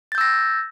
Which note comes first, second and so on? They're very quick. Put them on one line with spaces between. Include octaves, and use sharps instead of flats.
A6 G6 E6 A#6